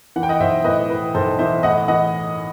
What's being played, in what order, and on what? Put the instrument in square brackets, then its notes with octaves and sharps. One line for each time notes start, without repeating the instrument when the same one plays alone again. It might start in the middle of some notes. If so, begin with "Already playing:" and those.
[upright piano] E3 F#5
G5
D#5 F#5
B1 C5 E5
A2 B4 D#5
E3 B4
B1 A4 C5
E3 C5 E5
A2 D#5 F#5
E3 D#5 F#5